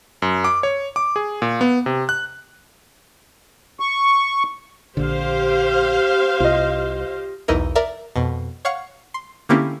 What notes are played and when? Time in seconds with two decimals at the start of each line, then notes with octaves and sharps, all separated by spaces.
0.22 F#2
0.44 D6
0.63 C#5
0.96 D6
1.16 G#4
1.42 A#2
1.61 B3
1.86 C3
2.09 F#6
3.80 C#6
4.97 A#1 D3 G4 C5 F5
6.40 C2 F4 D#5
7.48 B1 E2 E3 D#4 E4 A#4
7.75 A#4 D5 E5
8.16 F2 B2
8.65 C#5 F5 F#5 C#6
9.14 C6
9.49 D3 A#3 C4 C#4 E4 G4